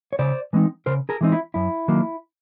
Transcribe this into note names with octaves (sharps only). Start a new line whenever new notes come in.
C#5
C#3 C5 D5
E3 G#3 C4 D#4
C#3 A#4 C5
G#4 A#4
E3 G#3 C4 D#4
E4
F#2 E4
D#3 F#3 A#3